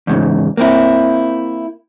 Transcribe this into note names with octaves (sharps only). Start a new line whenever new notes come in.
E2 G#2 C#3
A#3 C4 E4